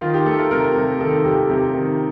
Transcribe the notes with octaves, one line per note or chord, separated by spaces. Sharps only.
D#3 F4
G4
A3 A4
A#4
C3 A#4
C3
D#3 A4
C3 G4
C3 G4
D#3